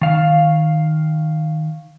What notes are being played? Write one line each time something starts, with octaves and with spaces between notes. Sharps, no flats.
D#3 F5